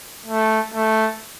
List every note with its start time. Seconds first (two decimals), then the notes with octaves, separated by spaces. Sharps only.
0.26 A3
0.73 A3